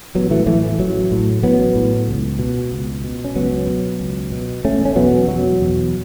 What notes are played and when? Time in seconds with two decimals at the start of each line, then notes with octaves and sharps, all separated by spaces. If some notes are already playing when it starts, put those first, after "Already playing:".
0.15 A1 F#3 B3
0.31 E3 A3
0.47 A2 E3 A3
0.79 A1 F#3
1.12 A2
1.43 A1 F#3 B3
1.75 A2
2.08 C#2
2.39 B2
2.72 C#2
3.04 B2
3.24 C#4
3.35 C#2 F#3 B3
3.67 B2
4.00 C#2
4.32 B2
4.65 E1 A3 C#4
4.85 C#4
4.96 E2 B2 F#3 B3
5.28 E1 F#3
5.60 E2 B2